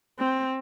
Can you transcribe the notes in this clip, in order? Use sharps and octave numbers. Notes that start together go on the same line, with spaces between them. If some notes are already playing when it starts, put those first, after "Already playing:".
C4